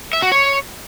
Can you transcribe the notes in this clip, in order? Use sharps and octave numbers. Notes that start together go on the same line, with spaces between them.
E5
F#4
C#5